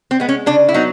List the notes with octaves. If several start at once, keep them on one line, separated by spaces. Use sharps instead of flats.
C4
G#3 B3
C#4
C#3 D4
E4
F#3 B3 D#4